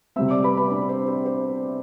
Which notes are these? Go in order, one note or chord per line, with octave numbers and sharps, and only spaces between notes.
C3 G3 C4 E5 E6
D5 D6
B4 B5
B4 B5
D4 D5
C5
C5
C5